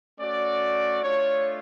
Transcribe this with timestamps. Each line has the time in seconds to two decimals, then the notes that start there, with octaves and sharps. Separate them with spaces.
0.19 A3 C#4 F#4 D5
1.02 A3 D4 F4 C#5